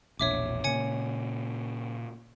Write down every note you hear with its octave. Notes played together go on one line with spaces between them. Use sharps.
E1 A#1 C#5 E5 D6
A#2 C#3 C#5 G#5 C#7